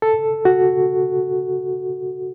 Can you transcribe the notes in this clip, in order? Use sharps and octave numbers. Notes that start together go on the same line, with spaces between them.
A4
F#4